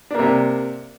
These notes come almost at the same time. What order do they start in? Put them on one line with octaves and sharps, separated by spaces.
D4 A#3 C3